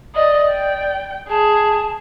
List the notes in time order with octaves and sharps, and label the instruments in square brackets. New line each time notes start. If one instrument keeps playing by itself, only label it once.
[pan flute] D5 [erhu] D#5
[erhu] G5
[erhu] G#4 [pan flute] A5